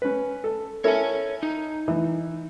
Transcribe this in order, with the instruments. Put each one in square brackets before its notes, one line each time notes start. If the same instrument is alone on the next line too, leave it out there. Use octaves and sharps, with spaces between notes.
[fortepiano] C#4 B4
A4
[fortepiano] E4 A4 A#4 [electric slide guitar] C#5 G#5
[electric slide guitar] D#4
[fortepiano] E3